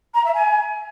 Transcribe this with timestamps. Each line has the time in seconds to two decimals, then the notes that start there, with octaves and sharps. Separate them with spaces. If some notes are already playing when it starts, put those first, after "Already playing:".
0.14 A#5
0.24 E5
0.34 G#5